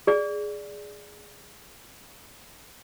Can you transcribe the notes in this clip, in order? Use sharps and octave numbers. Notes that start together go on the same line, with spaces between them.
G#4 D5